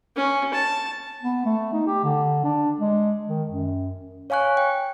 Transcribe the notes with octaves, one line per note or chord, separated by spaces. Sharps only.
C#4
A5
B3
A3
D#4
G4
D3
D4
G#3
D#3
F#2
C#5 F5 G#5 C#6 F#6
G5